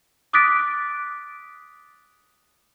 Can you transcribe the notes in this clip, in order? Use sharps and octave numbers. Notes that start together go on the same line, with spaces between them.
D6 D#6 F#6 A6 B6 D7